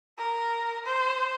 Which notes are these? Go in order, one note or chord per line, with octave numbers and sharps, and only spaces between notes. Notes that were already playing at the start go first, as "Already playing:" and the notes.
A#4
C5